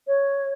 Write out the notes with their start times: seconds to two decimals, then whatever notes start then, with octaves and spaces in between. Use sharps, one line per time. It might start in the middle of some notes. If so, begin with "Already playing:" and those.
0.07 C#5